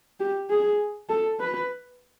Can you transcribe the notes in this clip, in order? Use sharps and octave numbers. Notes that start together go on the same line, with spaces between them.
G4
G#4
A4
B4